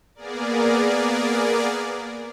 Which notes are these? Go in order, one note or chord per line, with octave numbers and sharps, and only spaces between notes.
A#3 B3 G#4 A#4 D5